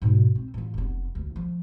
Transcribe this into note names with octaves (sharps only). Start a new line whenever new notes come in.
G#2 B2
C4
A1 F4
F1 B3
D2
F3